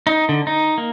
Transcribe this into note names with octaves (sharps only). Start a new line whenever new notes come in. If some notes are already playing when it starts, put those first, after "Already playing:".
D#4
D3
D#4
A#3